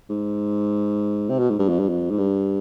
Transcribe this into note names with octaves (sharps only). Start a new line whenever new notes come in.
G#2
C3
B2
G#2
G2
F2
G2
F2
G#2
G2